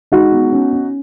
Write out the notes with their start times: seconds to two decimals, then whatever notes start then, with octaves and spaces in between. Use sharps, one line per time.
0.12 G#3 D#4 F#4
0.32 B3
0.52 C#4
0.73 C#4